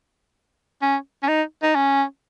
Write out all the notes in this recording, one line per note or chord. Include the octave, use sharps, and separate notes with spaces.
C#4
C#4
D#4
D#4
C#4